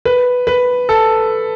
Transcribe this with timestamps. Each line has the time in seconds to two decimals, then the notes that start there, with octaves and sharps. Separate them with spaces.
0.05 B4
0.47 B4
0.89 A4